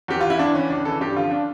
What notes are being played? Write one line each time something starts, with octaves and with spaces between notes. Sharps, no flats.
E2 G4
E3 F4
E4
E2 D4
E3 C#4
C#2 D4
C#3 E3 A4
G2 G4
D3 F3 F4
D4